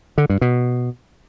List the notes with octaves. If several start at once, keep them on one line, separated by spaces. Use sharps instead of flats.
D3
G2
B2